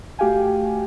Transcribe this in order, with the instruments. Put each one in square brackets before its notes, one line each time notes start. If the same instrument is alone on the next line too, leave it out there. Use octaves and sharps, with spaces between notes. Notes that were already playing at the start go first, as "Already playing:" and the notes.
[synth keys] A3 F#4 G4 F5 G5 G#5